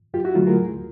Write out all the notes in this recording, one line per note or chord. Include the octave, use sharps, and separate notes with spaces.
F#2 F4 G4
E4 F#4
D3 F#3 A3 F4
G#4 A#4
D2